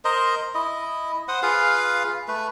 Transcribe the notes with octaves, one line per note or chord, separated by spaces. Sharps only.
A#4 C5 D#5
E4 D#5
C5 F#5 D#6
F4 G#4 B4 F5
A3 B4